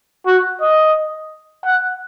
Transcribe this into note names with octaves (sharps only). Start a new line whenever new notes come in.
F#4
D#5
F#5